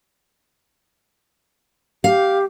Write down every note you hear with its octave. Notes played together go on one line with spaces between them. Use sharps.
G4 F5